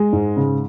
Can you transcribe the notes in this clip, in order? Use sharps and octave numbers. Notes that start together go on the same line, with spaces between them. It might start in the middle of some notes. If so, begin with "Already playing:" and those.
Already playing: G#3
G#2
C#3